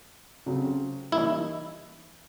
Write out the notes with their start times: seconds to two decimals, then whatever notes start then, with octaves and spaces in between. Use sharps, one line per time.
0.46 C#3 F#3 A3 C4
1.12 E3 G3 A#3 D#4 E4